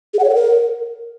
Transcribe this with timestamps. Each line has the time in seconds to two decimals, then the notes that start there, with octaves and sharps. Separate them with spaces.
0.14 G#4
0.19 F#5
0.24 C#5
0.29 A4
0.35 A#4